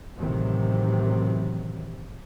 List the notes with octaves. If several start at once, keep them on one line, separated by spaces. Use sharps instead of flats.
A1 C3 D#3 E3 F#3